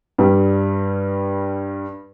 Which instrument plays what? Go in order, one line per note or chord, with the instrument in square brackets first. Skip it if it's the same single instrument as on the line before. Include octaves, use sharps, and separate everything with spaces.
[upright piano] G2 G3